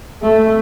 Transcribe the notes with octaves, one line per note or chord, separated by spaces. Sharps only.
A3